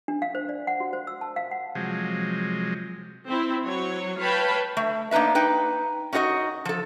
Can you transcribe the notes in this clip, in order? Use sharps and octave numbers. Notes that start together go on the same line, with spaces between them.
D4
F5
C5
D5
F#5
F#4
C5
E6
A5
F5
F#5
C3 F3 F#3 G#3
C4 E4
F#3 C#5
B4 C#5 F5 G5 A5 B5
A3
A#3 D4 D#4 B4 E5
D#4 B4 G5
C#4 D#4 F#4 C5 D#5
F3 A4